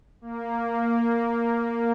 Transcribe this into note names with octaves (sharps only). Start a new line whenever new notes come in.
A#3